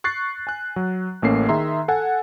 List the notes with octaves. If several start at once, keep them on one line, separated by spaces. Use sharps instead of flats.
C#6 F#6 A6 C7
G#5 F#6
F#3
A1 A3 A#3 C#4 C7
D#3 G#4 E5 A#5 C6
A4 F#5 G#5